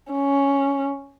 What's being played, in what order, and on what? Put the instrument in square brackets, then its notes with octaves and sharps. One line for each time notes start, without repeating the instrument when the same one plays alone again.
[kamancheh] C#4